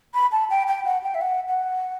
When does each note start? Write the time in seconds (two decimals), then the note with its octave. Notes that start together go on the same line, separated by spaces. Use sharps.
0.14 B5
0.31 A5
0.50 G5
0.67 G5
0.85 F#5
1.03 G5
1.14 E5
1.21 F#5
1.48 F#5